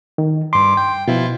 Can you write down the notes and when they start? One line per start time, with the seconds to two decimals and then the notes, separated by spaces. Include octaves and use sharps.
0.18 D#3
0.53 G2 C6 D6
0.77 G5
1.08 B2 F3 E4 F4